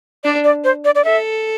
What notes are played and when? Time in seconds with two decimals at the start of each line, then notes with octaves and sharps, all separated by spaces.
0.24 D4 D5
0.44 D5
0.64 C5
0.85 D5
0.95 D5
1.05 A4 E5